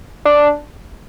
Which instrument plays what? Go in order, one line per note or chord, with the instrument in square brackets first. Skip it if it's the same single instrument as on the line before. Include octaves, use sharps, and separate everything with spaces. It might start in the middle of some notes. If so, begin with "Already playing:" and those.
[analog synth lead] D4